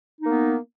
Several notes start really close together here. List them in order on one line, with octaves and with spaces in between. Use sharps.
D#4 A#3 B3